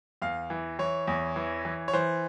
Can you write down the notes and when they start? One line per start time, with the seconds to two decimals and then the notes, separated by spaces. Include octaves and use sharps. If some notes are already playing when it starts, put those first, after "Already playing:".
0.22 E2 F5
0.50 E3
0.79 E3 C#5
1.07 E2
1.36 E3
1.65 E3
1.88 C#5
1.93 E3 C5